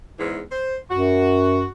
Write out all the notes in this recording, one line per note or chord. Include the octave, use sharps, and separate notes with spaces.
E2 G#2 E3
C5
F#2 F#4